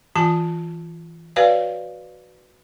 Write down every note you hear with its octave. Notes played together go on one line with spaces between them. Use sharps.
E3 F4 G#5 A5
F#4 B4 C#5 D5 F5 G#5